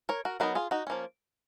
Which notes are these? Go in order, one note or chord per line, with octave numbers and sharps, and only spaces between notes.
A#4 C#5
F#4 A#4
F#3 B3 D#4 F#4 A#4
F4 G#4
D#4 F#4
F3 A#3 C#4